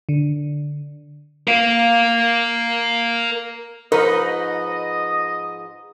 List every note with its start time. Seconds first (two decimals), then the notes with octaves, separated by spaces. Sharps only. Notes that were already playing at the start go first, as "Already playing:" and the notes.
0.09 D3
1.48 A#4 F5
3.92 G#2 F3 D#4 A#4 B4 D#5